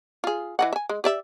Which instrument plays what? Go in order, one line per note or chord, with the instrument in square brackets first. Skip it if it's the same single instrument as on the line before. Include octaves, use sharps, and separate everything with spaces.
[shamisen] F4 G#4
E3 D#5 F#5
E5 G#5
G#3
G4 D5 E5